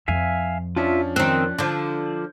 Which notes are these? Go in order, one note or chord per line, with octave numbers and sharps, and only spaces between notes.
F2 E5 F5 G#5
F3 C#4 D4 F4 E5
D#3 C4 F#6
D3 F3 D6 G6